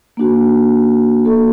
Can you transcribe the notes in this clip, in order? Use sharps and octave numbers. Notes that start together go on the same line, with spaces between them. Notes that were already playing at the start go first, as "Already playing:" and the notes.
A#3 D4 F#4
A#3 F#4 A4